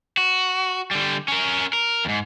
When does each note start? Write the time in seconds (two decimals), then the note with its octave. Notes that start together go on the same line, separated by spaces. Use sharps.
0.17 F#4
0.91 D3 G3
1.28 C#4 A#4
1.73 A#4
2.05 E2 G#2